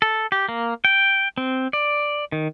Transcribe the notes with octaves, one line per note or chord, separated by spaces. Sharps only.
A4
G4
A#3
G5
C4
D5
D#3